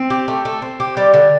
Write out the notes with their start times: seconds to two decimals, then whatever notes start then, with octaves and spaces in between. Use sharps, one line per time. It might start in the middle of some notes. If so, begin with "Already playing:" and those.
Already playing: C4
0.10 G4
0.28 A3
0.45 A3
0.62 C4
0.80 G4
0.97 G3
1.14 D3